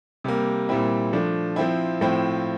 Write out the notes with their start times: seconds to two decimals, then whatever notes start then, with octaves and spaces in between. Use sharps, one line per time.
0.24 C3 G3 A#3
0.69 A#2 G3 C4 E4
1.13 F3 A3 D4
1.56 F3 C4 E4
2.01 A2 F3 C4 E4